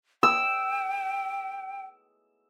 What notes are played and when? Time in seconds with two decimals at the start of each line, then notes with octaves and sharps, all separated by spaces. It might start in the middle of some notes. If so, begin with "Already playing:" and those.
0.23 G5 E6